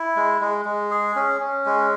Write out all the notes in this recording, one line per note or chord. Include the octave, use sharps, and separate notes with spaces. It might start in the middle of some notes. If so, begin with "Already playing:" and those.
Already playing: E4
G#3
G#3
G#3
G#4
C#4
C#4
G#3